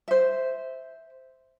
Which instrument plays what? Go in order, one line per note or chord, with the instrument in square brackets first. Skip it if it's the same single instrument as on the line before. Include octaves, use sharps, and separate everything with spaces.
[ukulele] C5 E5